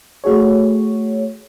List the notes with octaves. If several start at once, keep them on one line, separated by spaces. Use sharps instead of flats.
A3 F#4 G#4 C#5